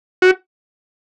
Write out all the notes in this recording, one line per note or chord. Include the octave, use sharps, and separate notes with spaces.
F#4